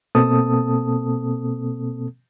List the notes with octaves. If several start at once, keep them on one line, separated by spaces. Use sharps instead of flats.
B2 A#3 C4 A4 A5 D#6